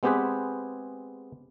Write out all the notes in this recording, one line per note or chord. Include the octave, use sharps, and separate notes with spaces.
G#3 B3 C4 G4 G#4 B4